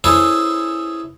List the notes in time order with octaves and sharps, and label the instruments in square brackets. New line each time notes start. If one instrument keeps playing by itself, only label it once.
[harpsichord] C#4 E4 G#4 A4 B4 C5